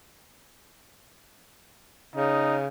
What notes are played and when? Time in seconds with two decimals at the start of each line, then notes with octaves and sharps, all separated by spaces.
2.16 C#3 D#4